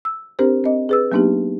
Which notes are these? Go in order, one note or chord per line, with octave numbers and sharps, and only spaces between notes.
E6
C4 D4 G4 A#4 C5
C4 D#5
G#4 B4 E6
F#3 A#3 B3 D4 D#4 G4